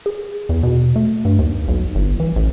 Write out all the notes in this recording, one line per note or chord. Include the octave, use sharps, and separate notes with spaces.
G#4
E2
B2
A3
G2
D#2
B1
G1
E3
A1